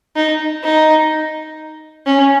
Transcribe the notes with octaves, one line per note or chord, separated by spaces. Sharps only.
D#4
D#4
C#4